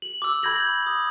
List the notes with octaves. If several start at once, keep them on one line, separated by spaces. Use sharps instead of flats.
F#7
D6 E6
B5 G6 G#6 A#6 F#7
D#6